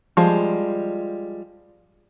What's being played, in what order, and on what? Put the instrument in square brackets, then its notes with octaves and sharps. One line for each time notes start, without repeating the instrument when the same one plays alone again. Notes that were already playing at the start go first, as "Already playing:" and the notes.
[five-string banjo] F3 G3 G#3